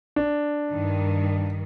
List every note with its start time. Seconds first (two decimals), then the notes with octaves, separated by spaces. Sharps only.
0.16 D4
0.70 G2 D#3